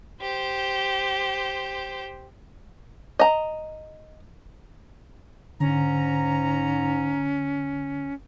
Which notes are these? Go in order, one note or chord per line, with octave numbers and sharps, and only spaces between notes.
G4 C5
D#5 A#5
G#2 D3 C#4 A#5